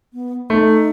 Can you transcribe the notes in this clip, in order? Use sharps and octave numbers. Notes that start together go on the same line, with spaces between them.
B3
A3 D#4